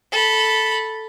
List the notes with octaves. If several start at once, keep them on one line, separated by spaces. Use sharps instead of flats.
A4 B5